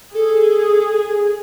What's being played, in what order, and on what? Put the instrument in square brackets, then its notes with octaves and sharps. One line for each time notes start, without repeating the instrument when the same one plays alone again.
[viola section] G#4 [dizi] A4